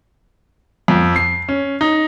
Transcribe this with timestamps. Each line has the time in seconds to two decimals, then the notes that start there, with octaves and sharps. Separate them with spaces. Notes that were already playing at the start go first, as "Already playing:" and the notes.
0.88 F2
1.16 C7
1.48 C#4
1.81 D#4